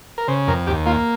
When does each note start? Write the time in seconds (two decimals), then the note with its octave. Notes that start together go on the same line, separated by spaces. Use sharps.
0.18 A#4
0.28 C#3 C5
0.47 F2 A#4
0.67 D#2 G4
0.86 A#3 F4